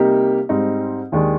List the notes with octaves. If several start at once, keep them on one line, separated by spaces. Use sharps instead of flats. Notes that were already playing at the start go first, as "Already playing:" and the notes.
Already playing: C3 G3 A#3 D#4 G4
G#2 G3 C4 D#4
D#2 D#3 G#3 D4